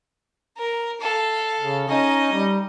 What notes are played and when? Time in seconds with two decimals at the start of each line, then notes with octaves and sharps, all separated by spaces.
0.57 A#4
1.01 A4 F5
1.60 C#3
1.88 C#4 D#4 D#5
2.32 G3